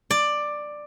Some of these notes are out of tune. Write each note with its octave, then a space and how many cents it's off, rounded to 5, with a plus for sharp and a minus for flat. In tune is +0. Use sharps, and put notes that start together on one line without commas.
D5 +10